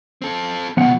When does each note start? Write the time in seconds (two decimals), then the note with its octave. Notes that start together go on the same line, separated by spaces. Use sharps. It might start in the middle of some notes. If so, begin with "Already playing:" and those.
0.22 C4 A4
0.77 C#2 B2 F3 B3 F#5